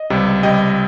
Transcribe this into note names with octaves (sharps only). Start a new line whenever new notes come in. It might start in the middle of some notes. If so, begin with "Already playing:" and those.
Already playing: D#5
C#2 C3 G3
C#2 C3 G3 D#5 G5